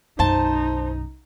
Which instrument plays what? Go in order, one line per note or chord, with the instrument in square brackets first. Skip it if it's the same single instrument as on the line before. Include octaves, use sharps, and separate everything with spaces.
[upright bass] B1 F#2 [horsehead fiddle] D#4 [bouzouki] C5 A5